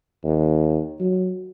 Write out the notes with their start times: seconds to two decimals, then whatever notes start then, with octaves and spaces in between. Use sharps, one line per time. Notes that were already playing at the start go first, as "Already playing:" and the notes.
0.24 D#2
1.00 F#3